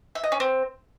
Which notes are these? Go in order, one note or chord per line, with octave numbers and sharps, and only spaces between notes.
E5
D#5
C#4
C4